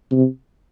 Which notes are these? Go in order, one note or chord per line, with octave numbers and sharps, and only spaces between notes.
C3